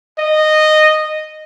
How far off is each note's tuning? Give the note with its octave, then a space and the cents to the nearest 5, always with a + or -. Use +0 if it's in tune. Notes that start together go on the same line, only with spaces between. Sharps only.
D#5 -10